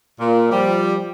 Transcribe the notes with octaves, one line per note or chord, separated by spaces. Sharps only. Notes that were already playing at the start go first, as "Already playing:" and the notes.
A#2
F3 G3